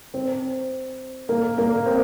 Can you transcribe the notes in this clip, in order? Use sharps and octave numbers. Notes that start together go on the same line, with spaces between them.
C4
A#3
A#3
C4